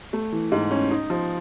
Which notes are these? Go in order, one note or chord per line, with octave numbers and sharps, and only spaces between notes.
A3
E3
G#2
C#4
D#4
F3